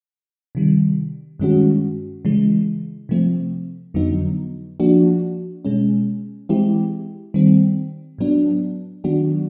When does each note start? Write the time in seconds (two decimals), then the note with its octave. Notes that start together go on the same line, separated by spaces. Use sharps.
0.55 C3 D#3 G3
1.40 G2 D#3 G#3 C#4 F#4
2.25 C#3 E3 G#3
3.09 C3 F3 A3 C4
3.94 F2 D3 F#3 B3 D#4
4.80 F3 A#3 D4 F#4
5.65 B2 G#3 C#4
6.49 E3 G#3 C4 E4 G4
7.34 D#3 G3 C4
8.18 A2 F#3 B3 D4
9.04 D#3 F#3 B3 D4 F#4